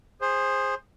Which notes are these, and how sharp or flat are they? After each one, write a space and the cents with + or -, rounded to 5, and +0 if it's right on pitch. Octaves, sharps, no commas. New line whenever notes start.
G#4 -15 C5 +15